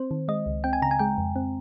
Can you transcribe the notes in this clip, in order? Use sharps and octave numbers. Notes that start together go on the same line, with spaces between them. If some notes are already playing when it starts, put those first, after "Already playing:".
Already playing: C4 C5
D#3
G#3 D#5
C#2
C4 G5
G#5
C#3 A#5
G#5
G#3 G5
F2
C4